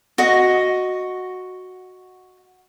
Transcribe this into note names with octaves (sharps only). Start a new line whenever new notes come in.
F#4 D#5